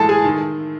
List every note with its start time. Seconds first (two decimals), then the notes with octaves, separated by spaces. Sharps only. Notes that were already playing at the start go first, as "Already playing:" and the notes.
Already playing: A2 E3 G#3 A4 A5
0.09 G#4 G#5
0.24 D#3